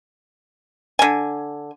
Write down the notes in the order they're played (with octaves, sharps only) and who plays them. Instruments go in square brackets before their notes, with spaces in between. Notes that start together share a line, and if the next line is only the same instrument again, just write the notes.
[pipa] D3 G#5